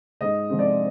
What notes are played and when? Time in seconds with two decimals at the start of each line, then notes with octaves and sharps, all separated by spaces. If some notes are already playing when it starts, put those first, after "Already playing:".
0.21 G#2 D#5
0.50 F3 G#3 C4
0.59 D5